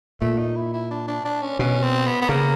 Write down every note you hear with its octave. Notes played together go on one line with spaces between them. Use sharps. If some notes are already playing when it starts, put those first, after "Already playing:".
A#2 A3
D#4
E4
E4
D4
D4
D4
C#4
B2 C#4
C4
B3
B3
C#3 A#3